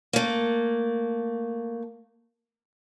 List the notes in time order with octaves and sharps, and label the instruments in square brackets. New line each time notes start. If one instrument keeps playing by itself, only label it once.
[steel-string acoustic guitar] A3 A#3